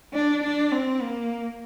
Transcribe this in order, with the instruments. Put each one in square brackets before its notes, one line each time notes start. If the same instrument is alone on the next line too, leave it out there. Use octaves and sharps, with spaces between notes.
[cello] D4
D4
C4
A#3